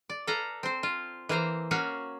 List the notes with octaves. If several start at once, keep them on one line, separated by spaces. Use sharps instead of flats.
D5
A4 B4 F5 A#5
C4 C5
F4
E3 A#3 C5 A#5
A#3 C#4 F#4 C#5 F5